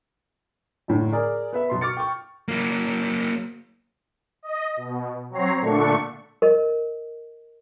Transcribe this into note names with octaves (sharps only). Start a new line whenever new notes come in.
F#2 A2 D3
G#4 A#4 D5
B3 B4 E5
F#2 B2 C6
C#6 D6 F6 A6 C#7
G5 C#6
F#3 A#3
D#5
B2
F#3 C4 C#5 A#5 C7
A#2 D3 A3 D4 C#6
A#4 D#5